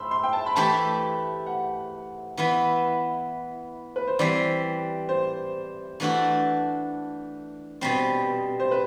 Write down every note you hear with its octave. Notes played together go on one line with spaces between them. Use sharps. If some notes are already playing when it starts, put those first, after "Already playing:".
Already playing: B5 C6 E6
C6
G5
A5
B5
E3 A3 E4 G4 A5
F#5
E3 B3 E4
B4
C5
E3 G3 C4 D5
C5
E3 A3 D4 F#4 A4
B2 G3 C4
C5
B4